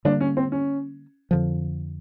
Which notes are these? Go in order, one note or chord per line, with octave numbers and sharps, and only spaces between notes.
D3 G3 A#3 D4
C#4
C4
C#4
F2 D3 F3